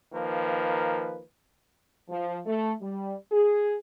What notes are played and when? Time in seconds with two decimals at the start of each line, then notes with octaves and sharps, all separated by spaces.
0.13 D#3 F3 A#3 B4
2.09 F3
2.46 A3
2.81 G3
3.31 G#4